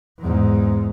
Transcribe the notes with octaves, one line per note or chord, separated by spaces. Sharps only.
E2 G#2